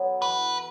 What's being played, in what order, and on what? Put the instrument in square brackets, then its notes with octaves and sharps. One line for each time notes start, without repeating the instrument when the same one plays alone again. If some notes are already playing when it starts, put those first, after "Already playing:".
Already playing: [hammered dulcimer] F#3 A3 B3
[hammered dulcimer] E3 [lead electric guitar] B4